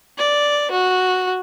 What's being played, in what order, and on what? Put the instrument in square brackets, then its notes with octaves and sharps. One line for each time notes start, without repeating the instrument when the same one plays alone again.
[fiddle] D5
F#4